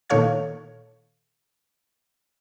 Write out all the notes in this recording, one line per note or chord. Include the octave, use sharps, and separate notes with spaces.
A#2 D#3 A4 C#5 F5 G#6